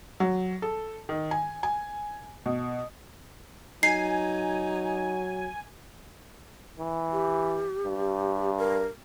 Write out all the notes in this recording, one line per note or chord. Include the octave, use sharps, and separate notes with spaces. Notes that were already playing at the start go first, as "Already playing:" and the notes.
F#3
A4
D#3
G#5
G#5
B2
F#3 D#4 G#5 C7
E3
G4
G2
A#4